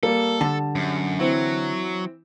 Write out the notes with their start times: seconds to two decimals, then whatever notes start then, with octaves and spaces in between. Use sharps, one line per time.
0.03 G3 A#3 A4
0.41 D3 A5
0.75 F#2
1.19 E3 F#3 C4 E4